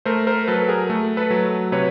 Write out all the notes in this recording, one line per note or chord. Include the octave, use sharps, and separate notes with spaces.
A3 A#4 C5
A#4 C5
F#3 A4 B4
G#4 A#4
A3
A4 B4
F#3
C3 B4 C#5